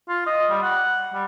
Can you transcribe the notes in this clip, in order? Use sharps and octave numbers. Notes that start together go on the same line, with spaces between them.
F4
D#5
G3
F#5
G3